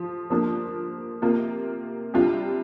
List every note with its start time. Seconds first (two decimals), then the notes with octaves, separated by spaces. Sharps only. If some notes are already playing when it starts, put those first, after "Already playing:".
Already playing: F3 F4
0.30 F3 A#3 D4
1.22 C3 A#3 F4
2.14 C3 G3 D4 F4